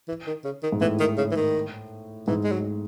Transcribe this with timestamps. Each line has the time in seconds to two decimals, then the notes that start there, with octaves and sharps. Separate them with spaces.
0.08 E3
0.27 D#3
0.45 C#3
0.63 D#3
0.72 G#2
0.81 A2 E3
1.00 D#3
1.18 C#3
1.31 E3
1.36 D#3
2.27 G#2 E3
2.44 G#3
2.52 F#3